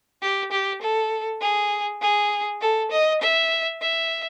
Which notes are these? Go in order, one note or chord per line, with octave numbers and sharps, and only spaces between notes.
G4
G4
A4
G#4
G#4
A4
D#5
E5
E5